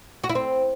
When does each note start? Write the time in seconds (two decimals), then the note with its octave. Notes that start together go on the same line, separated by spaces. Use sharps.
0.24 F#4
0.29 E4
0.35 C4